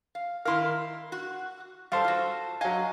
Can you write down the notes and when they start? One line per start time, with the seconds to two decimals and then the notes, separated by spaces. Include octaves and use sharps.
0.15 F5
0.45 D#3 E4 A#4 F5 C6
1.12 F#4
1.92 G3 A4 C5 F5
2.04 F4 F#4
2.61 F#3 D#5 F5 G#5